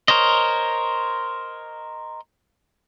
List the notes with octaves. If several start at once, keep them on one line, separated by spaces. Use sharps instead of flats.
A#4 C5 C#5 D#5